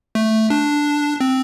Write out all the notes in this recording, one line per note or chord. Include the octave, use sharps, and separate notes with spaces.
A3
D4
C4